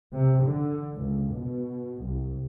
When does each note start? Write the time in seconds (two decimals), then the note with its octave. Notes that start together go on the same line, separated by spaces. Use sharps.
0.13 C3
0.42 D3
0.96 C#2
1.35 B2
2.03 C2